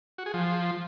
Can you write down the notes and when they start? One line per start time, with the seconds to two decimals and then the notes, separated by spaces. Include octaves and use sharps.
0.18 F#4
0.26 G#4
0.34 F3